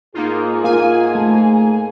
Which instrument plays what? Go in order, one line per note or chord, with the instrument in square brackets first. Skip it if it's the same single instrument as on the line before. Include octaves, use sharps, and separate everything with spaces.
[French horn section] G#2 G#4 [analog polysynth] A#3 D#4 F4
[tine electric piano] A#3 [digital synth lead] F4 [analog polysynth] G#5
[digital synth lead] A3